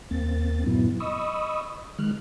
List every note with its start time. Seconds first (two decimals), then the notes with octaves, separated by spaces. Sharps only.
0.11 D#2 A#3 C4 A6
0.66 G2 A#2 F#3 B3 E4
1.00 D#5 B5 C#6 D#6 E6
1.98 D#3 G#3 F6 F#6